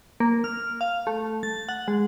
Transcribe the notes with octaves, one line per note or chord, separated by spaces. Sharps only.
A#3
F6
F5
A3
A6
F#5
G#3